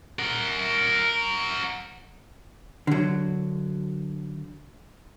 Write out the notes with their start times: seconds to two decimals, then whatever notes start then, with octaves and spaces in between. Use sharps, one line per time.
0.19 A#4 F#5
2.87 D3 F#3